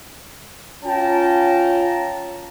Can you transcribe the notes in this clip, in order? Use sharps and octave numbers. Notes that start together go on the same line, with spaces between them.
C#4 F4 G5 A5 A#5